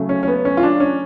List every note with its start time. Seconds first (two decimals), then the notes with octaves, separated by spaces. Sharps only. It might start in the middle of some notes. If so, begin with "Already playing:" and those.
Already playing: C#3 F#3 A3
0.09 C#4
0.23 C#4
0.28 B3
0.45 C#4
0.57 F4
0.63 D4
0.80 C#4